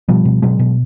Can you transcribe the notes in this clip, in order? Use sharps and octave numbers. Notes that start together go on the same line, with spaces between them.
B2 F3 G3
B2
B2 F#3 G#3
B2